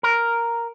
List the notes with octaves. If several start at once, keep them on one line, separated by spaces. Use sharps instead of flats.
A#4